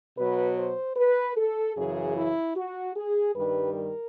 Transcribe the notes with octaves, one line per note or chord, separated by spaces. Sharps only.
B2 F#3 B4
C5
B4
A4
F#2 C#3 E3 G#4
E4
F#4
G#4
G2 D#3 G3 B4
A#4